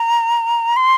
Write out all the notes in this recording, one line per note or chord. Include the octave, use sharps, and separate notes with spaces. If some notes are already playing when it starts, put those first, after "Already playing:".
Already playing: A#5
C6